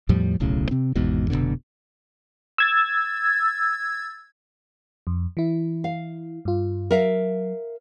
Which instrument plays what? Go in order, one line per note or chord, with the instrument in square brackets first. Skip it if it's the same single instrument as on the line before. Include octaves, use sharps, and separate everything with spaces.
[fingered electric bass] E2 A2 F3 G3
D1 B1 A2 C#3
C3 C4
G#1 E2 G#2 B2
F1 C#2 B2 D3
[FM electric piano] E6 G#6 A6
F2
E3 E4
[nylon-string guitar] F5
[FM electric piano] G2 F4
[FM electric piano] F#3 [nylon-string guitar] A#4 E5 F5